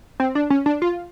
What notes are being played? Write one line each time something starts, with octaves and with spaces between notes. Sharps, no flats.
C4
D4
C#4
D4
F4